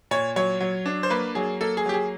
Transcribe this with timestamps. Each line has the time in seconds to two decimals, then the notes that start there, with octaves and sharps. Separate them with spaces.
0.11 A#2 C#5
0.36 F#3 C#5
0.61 F#3
0.86 D4
1.03 C5
1.10 A#3 B4
1.35 F#3 G#4
1.61 A#3 A4
1.77 G#4
1.86 F#3 G4
1.94 G#4